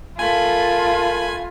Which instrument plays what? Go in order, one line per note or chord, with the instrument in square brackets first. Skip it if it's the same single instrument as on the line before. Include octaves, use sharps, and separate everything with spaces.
[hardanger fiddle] A3 B5 [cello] F4 [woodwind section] A#4 A5 [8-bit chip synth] G#5